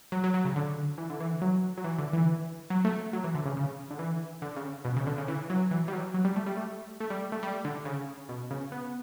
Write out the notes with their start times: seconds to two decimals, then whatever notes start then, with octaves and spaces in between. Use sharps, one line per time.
0.12 F#3
0.24 F#3
0.34 F#3
0.45 C#3
0.56 D3
0.98 E3
1.10 D3
1.20 E3
1.42 F#3
1.77 F#3
1.84 E3
1.98 D3
2.13 E3
2.70 F#3
2.85 A3
3.13 F#3
3.24 E3
3.35 D3
3.45 C#3
3.57 C#3
3.90 D3
3.99 E3
4.42 D3
4.57 C#3
4.85 B2
4.96 C#3
5.07 D3
5.18 C#3
5.28 E3
5.50 F#3
5.71 E3
5.88 G3
5.93 F#3
6.14 F#3
6.25 G3
6.36 A3
6.46 G3
6.57 A3
7.00 A3
7.10 G3
7.32 A3
7.43 G3
7.65 D3
7.85 C#3
8.29 B2
8.51 C#3
8.72 B3